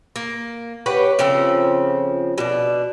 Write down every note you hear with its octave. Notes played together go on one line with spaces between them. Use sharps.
A#3
G4 B4 C#5 F#5
C#3 F3 C4 A4
B2 D4